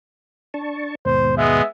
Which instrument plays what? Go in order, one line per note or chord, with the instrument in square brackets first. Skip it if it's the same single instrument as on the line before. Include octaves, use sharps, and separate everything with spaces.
[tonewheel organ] D4 A5 C#6
[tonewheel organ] D#2 G#2 B2 [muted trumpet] C5
[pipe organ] G#3 B3 [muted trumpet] E5